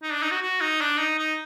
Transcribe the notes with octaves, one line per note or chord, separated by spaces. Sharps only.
D#4
D4
D#4
F#4
F#4
D#4
D4
D#4
D#4